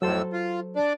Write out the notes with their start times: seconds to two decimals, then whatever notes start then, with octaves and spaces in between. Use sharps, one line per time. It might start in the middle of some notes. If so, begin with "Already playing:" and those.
0.02 F2 A2 F#3 A4 C5 E6
0.33 F4
0.76 D4 D5